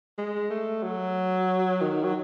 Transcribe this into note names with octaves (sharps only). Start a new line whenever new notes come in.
G#3
A3
F#3
D#3
F#3